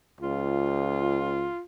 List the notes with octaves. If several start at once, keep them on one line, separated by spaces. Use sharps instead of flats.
C#2 F4